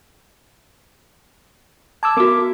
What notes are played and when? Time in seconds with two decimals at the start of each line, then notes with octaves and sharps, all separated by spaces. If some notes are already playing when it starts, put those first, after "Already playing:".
2.03 A5 D6 E6 G#6
2.17 B3 F#4 A#4 D6